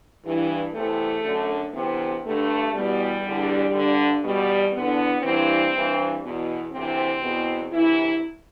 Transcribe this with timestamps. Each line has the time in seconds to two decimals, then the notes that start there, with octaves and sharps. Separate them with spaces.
0.24 G2 E3
0.74 E2 C3 E3 A3
1.24 F#2 D3
1.74 D2 C3 E3 B3
2.24 G2 D3 A3
2.73 E2 B2 G3
3.23 E2 D3
3.73 G2 D3
4.23 E2 B2 G3
4.73 E2 D3 B3
5.23 G2 E3 C4
5.73 G2 E3
6.23 E2 B2
6.73 D2 C3 E3 C4
7.22 E2 B2
7.72 D2 C3 E3 E4